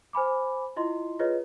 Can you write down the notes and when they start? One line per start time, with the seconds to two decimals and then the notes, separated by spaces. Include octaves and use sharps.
0.13 C5 G#5 B5 D6
0.76 E4 F4 D#5 C6
1.19 F4 G#4 B4 C#5 D#5